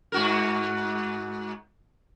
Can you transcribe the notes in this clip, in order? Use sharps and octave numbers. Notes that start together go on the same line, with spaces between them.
G#2 F#4 A#4